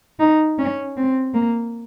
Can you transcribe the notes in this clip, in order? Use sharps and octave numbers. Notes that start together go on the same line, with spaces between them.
D#4
C#4
C4
A#3